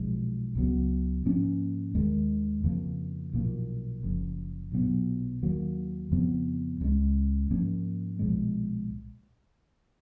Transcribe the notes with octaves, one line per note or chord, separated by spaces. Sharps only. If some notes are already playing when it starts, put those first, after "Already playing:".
Already playing: B1 A#2 F3 G#3
C#2 C#3 F#3 B3
G#2 F3 A#3 C#4
D#2 D#3 G#3
F2 C#3 F3 A#3
B1 A#2 F3 A#3
F#1 F#2 C#3 F3
B1 A#2 F#3 B3
D#2 D#3 F#3 A#3
F2 C#3 F3 B3
C#2 C#3 G#3
G#2 F3 A#3 C#4
B1 A#2 F3 G#3